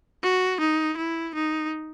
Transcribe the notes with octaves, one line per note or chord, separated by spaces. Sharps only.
F#4
D#4
E4
D#4